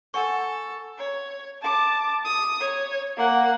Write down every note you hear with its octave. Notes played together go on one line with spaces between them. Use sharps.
A4 C5 F#5 G#5 C#6
C#5
A5 D6
D#6
C#5
A#3 F#5